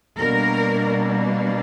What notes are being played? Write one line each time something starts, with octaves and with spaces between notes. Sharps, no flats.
B2 G3 A#3 D4 A#4